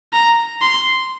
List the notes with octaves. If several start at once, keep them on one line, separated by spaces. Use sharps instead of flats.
A#5
C6